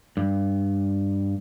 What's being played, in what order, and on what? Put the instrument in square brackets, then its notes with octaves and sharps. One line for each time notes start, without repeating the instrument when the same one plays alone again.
[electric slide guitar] G2